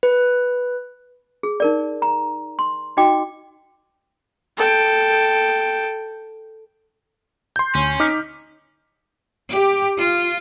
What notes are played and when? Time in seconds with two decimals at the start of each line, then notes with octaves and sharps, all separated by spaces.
0.03 B4
1.43 G#4
1.60 D#4 A#4 D5
2.02 A#5
2.59 C6
2.97 D#4 F#4 D#5 G5 D6
4.57 A4 G5
7.56 C6 G6
7.75 D2 C#4
8.00 D#4 D6 F6 B6
9.53 G4
9.97 F4